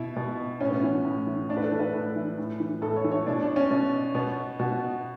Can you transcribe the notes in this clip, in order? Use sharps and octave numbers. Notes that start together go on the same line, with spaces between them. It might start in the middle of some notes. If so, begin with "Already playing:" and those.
Already playing: B2 E4
B2
A2 C#4
B3
E3 C#4
A2
E3
A2 D4
B4
A4
E3
B4
A2
E3
A2
E3
A2 A4
C#5
E3
C#5
B2 D4
D4
C#4
B2
B2 B3
B2 F#4